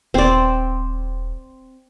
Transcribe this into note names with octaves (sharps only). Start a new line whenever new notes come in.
D#1 C4 D5